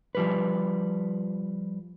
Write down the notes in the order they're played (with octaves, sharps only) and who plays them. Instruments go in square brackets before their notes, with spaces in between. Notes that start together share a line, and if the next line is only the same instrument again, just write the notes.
[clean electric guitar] F3 G3 B4